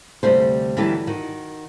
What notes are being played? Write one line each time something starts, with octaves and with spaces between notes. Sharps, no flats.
D2 C3 G3 A3 C5
D2 E3 F#3 G3 G4 A4
D#3 F#4